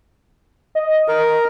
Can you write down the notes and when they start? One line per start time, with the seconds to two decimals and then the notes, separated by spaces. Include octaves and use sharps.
0.75 D#5
1.08 A#4